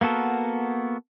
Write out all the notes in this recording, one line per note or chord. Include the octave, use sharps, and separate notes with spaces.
A#3 B3 F#4 A4 A#4